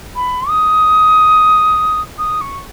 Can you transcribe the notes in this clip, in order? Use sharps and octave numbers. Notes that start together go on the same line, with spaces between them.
B5
D#6
D#6
C#6